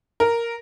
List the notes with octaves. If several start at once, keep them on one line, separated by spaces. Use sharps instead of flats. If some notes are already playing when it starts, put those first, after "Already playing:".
A#4